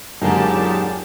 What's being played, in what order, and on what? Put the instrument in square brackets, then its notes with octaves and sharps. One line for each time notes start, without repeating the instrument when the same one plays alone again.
[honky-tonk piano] F#2 D3 [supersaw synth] A#2 G4 A5 [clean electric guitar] D#4 G#4